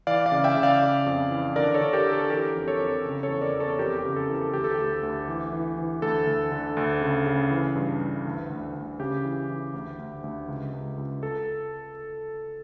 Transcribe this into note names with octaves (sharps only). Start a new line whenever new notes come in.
E3 D5 F5
D5 F5
C#3
E5 G5
C#3
D5 F5
C#3
F2
E3
D3 A#4 D5
A4 C#5
D3
G4 A#4
D3
A4
E3 G4 A#4
F2
A4 C#5
F2
C#3
A4 C#5
E2
A#4 D5
E2
A4 C#5
F2 G4 A#4
G4
C#3
A4
E3
A4
D2 G4
A4
D2 G4
D2
E3
E3
E3
D2 A4
D2
D3
D2
C#3
C#3
E3
G2
E3
D2
D2
D2
C#3 G4
E3
E3
D2
D2
D2
C#2
C#2
C#2
A4